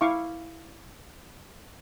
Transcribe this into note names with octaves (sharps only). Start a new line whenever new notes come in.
E4 F5 C#6 D6